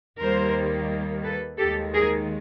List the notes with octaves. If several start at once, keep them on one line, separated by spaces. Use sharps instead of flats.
D#2 D#3 G3 A#3 A#4 C5
A4 B4
D#2 D#3 G#3 G4 A4
G#4 A#4